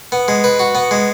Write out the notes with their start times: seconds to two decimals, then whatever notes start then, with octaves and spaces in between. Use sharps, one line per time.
0.12 B3
0.28 G#3
0.44 B4
0.59 F#4
0.75 B3
0.91 G#3